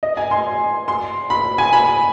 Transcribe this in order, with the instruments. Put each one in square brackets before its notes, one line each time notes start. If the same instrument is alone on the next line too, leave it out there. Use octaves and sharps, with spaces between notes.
[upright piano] D#5
G#5
C6
C6
B5
G#5
B5